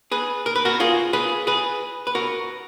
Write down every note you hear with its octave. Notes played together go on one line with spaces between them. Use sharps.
G#4 B4
A#4
B4
F#4 A#4
F4 G#4
G#4 B4
G#4 B4
B4
F#4 A#4